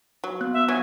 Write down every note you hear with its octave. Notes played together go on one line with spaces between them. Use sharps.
F#3
B3 F#6
E5
F#3 G#5